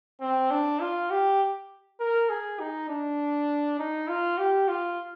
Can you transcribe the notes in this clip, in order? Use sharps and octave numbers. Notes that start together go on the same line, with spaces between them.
C4
D4
F4
G4
A#4
G#4
D#4
D4
D#4
F4
G4
F4